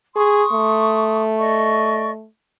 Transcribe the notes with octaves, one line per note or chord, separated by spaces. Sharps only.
G#4 C6 C#6 D#6
A3
D5 D#5 C#6